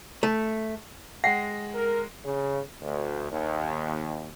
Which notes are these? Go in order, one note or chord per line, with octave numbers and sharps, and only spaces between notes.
A3
G#3 F#5 G5 A#6
A#4
C#3
D2
D#2